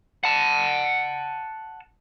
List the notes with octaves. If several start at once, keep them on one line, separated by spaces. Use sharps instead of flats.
F#5 A5